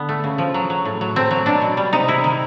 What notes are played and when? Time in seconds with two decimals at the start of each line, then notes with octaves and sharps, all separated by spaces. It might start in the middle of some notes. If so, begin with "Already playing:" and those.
Already playing: D3 B3
0.09 A3
0.24 C#3
0.38 F3
0.54 F#3
0.70 F#3
0.85 A2
1.01 F#3
1.16 A3 C4
1.31 F#3
1.46 B2 D4
1.62 B2
1.77 G3
1.93 C3 D#4
2.08 C3 E4
2.24 D#3